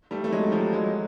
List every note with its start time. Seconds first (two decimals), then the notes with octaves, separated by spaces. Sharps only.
0.11 G3 A3
0.24 A3
0.32 F#3 G#3
0.52 F3 G3
0.73 F#3 G#3